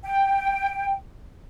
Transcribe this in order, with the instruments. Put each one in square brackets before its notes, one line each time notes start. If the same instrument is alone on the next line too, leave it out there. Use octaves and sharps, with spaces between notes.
[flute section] G5